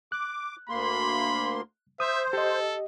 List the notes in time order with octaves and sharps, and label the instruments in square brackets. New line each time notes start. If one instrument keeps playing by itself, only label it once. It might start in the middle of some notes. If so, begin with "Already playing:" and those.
[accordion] D6 [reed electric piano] F#6
[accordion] D2 A#3 C6 [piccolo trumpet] B5
[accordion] C5 [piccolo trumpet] E5 [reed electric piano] D#6
[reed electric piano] G4 D#5 [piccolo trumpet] A4